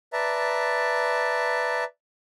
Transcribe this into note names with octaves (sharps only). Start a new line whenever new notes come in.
B4 D5 E5 A5 A#5